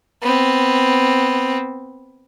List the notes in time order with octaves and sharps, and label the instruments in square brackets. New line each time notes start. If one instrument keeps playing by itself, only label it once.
[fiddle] B3 C4